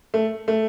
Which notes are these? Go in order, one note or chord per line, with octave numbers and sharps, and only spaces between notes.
A3
A3